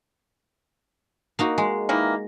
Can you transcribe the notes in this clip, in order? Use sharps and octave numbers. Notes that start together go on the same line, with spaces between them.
A#3 D#4 F#4
G#3
D#3 E3 A#3